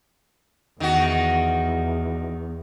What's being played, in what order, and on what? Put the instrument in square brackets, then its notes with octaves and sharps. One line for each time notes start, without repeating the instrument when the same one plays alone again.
[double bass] E2 [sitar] D#3 F#4